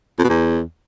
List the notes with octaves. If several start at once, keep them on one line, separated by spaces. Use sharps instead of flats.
F2
B2
E2